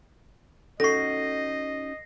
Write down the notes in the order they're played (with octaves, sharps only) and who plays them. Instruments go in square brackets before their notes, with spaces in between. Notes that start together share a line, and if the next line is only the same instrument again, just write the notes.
[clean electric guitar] C#4 D#4 F#4 [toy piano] A4 C#6 [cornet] D#5 [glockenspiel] A#6 C7